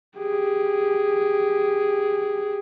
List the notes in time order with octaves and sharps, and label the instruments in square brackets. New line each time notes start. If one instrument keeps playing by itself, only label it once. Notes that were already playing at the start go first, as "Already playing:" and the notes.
[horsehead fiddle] G4 G#4